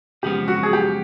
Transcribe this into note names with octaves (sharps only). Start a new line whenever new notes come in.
F#2 C#3 F3 G#3 B3 G4
F#4
G#4
G4